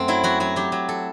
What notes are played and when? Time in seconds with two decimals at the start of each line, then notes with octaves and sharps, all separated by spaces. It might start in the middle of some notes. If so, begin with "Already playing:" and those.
Already playing: F#2 A3 C4
0.08 F#3 E4
0.24 F#3 F#4
0.40 F#3 F#4
0.56 F#3 G4
0.72 F#3
0.89 A4